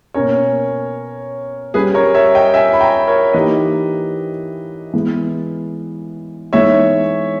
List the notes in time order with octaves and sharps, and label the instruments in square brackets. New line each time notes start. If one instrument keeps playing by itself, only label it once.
[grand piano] B2 A#3 C#4 [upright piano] A#4 C#5
[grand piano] G3 C#4 G4 [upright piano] G#4 B4
[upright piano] A#4 C#5
C#5 E5
D#5 G5
E5 G#5
B5
G5 A#5
A#4 C#5
[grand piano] E3 A#3 D#4 G4 [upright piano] B4 D#5
[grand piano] E3 G#3 B3
[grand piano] E3 G#3 B3 D#4 [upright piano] C#5 E5